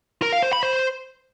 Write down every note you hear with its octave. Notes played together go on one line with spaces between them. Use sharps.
A#4
F5
C5
B5
C5